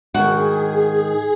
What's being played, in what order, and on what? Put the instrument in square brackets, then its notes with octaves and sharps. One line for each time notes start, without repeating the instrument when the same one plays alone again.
[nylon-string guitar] G#2 D#3 [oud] F#4 [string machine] G#4